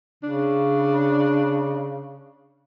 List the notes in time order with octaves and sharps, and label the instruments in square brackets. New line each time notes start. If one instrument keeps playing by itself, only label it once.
[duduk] C#3 [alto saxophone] D4